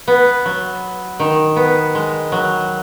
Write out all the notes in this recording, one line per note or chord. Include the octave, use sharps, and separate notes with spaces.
B3
F#3
D#3
B3
G#3
F#3